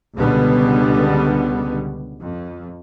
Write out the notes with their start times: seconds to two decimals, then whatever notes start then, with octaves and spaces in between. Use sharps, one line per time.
0.14 C#2 B2 D3 G3 B3
2.20 F2